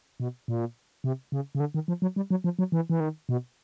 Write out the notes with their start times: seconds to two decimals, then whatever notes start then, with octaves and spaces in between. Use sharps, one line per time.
0.20 B2
0.48 A#2
1.04 C3
1.32 C#3
1.55 C#3
1.60 D3
1.74 D#3
1.88 F3
2.02 F#3
2.16 G3
2.31 F#3
2.44 F3
2.59 F#3
2.72 E3
2.90 E3
3.00 D#3
3.29 B2